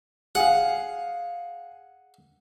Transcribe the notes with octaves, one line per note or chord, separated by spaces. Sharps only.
G#4 F5 F#5